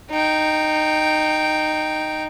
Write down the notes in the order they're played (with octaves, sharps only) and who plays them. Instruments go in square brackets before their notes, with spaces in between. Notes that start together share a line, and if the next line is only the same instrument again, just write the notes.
[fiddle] D#4 G5